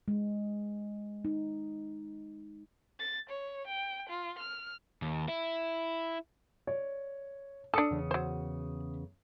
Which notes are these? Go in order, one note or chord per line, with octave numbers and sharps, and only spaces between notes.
G#3
D#4
A6
C#5
G5
F4
F6
D#2
E4
C#5 D5
D4 A4 D#6 C#7
E2 C#3
F#3 C5